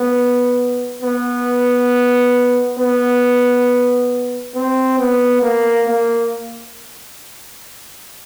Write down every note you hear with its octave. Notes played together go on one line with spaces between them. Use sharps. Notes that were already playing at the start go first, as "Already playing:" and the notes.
Already playing: B3
B3
B3
C4
B3
A#3
A#3